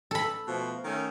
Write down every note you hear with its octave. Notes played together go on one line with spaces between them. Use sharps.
A4 B5
B2 F3 A3
D#3 A3 C#4